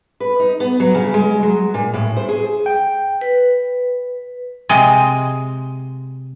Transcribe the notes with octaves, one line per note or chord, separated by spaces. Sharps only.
B4
D#4
B3
F#3
C#3
G#3
F#3
A#2
A2
C5
G#4
G5
B4
C3 G#3